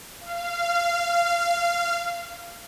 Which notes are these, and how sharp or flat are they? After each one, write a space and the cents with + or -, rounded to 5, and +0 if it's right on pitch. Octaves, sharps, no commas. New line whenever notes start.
F5 -20